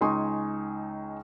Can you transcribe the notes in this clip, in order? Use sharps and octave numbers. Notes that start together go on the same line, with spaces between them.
C#2 D#4 G#5 C6 C#6 D#6